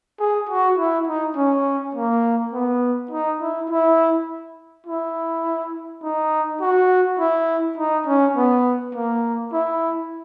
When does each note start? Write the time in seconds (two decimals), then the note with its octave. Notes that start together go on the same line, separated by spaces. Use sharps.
0.20 G#4
0.49 F#4
0.78 E4
1.07 D#4
1.36 C#4
1.95 A#3
2.53 B3
3.11 D#4
3.41 E4
3.70 E4
4.86 E4
6.03 D#4
6.61 F#4
7.19 E4
7.78 D#4
8.07 C#4
8.36 B3
8.94 A#3
9.53 E4